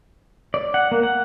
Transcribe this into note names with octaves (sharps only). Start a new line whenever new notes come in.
D5
F#5
A#3
F#5